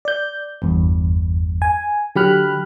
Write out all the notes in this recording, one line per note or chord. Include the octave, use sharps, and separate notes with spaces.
D5 G6
G1 E2 G2
G#5
D3 F#3 G4 B5 F6 F#6